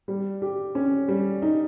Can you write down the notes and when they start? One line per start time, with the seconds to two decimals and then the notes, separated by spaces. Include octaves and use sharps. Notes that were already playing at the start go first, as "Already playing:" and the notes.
0.08 G3
0.42 G4
0.75 C#4
1.08 G3
1.42 D#4